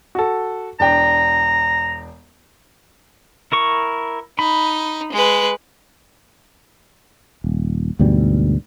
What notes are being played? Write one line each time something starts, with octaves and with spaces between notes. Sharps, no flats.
F#4 A4
E1 D4 G5 A#5
E4 A#4 C#6
D#4 B5
G#3 B4
D#1
D2 G#2 B2 G3